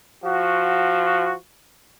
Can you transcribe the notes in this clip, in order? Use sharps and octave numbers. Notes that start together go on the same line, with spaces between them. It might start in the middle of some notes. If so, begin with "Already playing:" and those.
F3 F#4